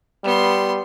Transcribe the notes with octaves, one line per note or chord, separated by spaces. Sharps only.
G3 B3 C6